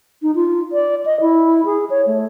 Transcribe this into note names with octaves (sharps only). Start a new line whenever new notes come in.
D#4
F4
D5
D#5
E4
G#4
C#5
A3